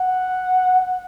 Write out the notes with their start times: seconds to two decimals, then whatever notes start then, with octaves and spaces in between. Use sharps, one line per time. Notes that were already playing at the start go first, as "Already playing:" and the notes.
Already playing: F#5